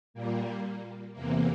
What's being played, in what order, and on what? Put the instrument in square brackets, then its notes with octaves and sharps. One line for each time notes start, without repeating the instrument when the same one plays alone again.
[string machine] A#2 G3 A#3
E2 C3 E3 A#3